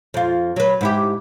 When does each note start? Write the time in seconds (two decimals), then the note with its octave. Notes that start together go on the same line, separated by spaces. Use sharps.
0.14 F2 F4
0.56 F#3 B4
0.81 G#2 E4 G4